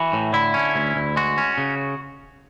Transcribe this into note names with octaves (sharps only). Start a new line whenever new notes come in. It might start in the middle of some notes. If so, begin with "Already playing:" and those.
Already playing: E3 F#4
A2
D3 E4
C#4
D2
D2
G#3 F#4
C#4
C#3